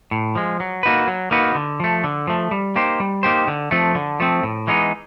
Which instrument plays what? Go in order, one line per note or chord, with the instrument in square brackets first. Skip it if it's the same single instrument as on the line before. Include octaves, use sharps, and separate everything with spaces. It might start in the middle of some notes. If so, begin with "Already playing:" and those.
[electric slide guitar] A2
F3 G#3
F#3
A#3 D#4 F#4 B4
F#3
A#3 D#4 F#4 B4
D3
F3 A3
D3
F3 A3
G3
A#3 D#4 G4 C5
G3
A#3 D#4 G4 C5
D3
F3 A3 C4
D3
F3 A3 C4
A2
E3 G#3 B3 D#4